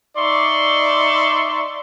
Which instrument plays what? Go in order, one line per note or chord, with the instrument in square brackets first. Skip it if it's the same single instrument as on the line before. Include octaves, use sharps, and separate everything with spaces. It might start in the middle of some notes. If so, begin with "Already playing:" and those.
[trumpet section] D#4 D5 E5 C6 C#6